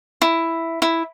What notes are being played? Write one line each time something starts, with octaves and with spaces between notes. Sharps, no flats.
E4
E4